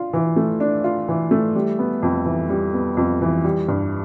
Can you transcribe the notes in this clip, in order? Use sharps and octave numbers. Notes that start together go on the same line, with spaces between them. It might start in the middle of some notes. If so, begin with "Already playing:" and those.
Already playing: D4 F4
E3
A3
D4
F4
E3
A3
G3
B3
F2
E3
G3
B3
F2
E3
G3
G2